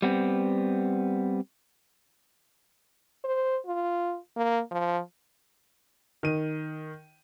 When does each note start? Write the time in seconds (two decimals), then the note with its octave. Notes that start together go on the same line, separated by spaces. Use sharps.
0.02 G3 B3 C4
3.24 C5
3.66 F4
4.37 A#3
4.71 F3
6.23 D#3 D#7